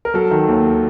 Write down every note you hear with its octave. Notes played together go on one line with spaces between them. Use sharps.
A#4
F#3 A4
D#3
D#2